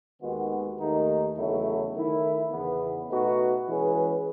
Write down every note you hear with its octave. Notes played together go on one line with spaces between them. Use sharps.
D#2 D#3 G#3 B3 F#4
D#2 D#3 A3 D#4
E2 C#3 F#3 A3 E4
D#3 A3 E4
E2 C#3 E3 B3
B2 A3 D#4 F#4 B4
E3 G#3 C#4 G#4 B4